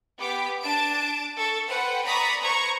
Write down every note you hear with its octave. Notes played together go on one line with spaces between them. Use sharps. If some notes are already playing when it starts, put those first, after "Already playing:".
B3 G4 D6 B6
D4 A5 D7
A4 C#6 A6
B4 C5 F#5 G5
D5 A#5 B5 C#6 D#6 B6
B4 C5 A#5 C#6 G#6